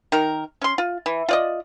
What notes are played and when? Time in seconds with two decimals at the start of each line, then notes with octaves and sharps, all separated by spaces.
0.12 D#3 A#4
0.62 C#4 C6
0.78 F4
1.06 E3
1.28 F4 D5 D#5